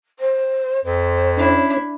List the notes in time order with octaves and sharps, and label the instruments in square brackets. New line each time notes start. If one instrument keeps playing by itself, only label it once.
[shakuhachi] C5
[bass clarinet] F2 [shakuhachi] C5
[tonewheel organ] C#4 [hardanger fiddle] D4 E4